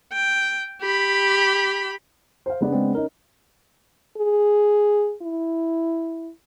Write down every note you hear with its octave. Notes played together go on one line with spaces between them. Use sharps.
G5
G4 B5
C5 F5
C#3 B3 D4
G#3 C4
C#4 D#4 A#4
G#4
E4